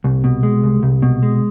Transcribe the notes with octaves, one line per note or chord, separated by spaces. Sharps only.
C2
B2
G#3
C2
C2
B2
G#3